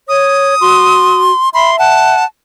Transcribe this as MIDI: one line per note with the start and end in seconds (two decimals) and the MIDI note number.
0.09 0.54 73
0.09 1.22 87
0.61 1.32 66
0.61 1.49 84
1.54 2.15 76
1.54 1.71 83
1.54 1.79 84
1.79 2.24 78
1.79 2.25 81